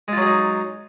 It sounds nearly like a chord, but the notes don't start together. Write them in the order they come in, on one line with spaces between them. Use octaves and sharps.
G#3 F4 F#3 G#4 D#4